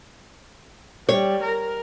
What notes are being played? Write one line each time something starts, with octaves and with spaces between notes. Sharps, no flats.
G3 C#5
A#4